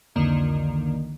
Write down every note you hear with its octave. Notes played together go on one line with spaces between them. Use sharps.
C2 F2 D3 D#3 A#3